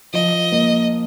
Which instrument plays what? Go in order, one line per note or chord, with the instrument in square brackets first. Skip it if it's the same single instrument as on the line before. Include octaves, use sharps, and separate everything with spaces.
[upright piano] F3 [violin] D#5
[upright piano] A#3